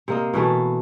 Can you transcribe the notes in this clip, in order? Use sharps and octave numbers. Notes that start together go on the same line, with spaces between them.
C3 A#3 D#5
B2 E3 A3 A#3